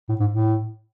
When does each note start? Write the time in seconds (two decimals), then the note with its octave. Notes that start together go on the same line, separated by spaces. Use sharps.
0.09 A2
0.20 G#2
0.32 A2